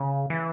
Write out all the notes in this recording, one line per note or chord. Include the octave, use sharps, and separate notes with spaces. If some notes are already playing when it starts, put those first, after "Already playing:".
Already playing: C#3
E3